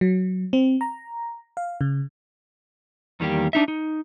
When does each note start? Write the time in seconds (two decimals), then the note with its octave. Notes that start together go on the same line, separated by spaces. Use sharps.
0.01 F#3
0.53 C4
0.81 A#5
1.57 F5
1.81 C#3
3.20 E2 D#3 G3 A#3 G4
3.53 D4 D#4 E5
3.68 D#4